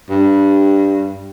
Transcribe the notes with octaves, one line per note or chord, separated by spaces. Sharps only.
G2